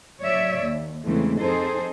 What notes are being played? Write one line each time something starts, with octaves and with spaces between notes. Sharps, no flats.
F#3 C#5 D5 E5
D#2
E2 C#3 E3 G#3 A3 C4
F2 C4 D#4 G#4 A4 C5